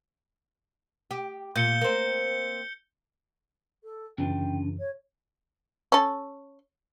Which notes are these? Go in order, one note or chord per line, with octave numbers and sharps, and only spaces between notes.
G4
A#2 G6 C#7 G7
A#3 C4
A4
F#2 C#3 E3 C#4 D4 F4 G5
C#5
C#4 A4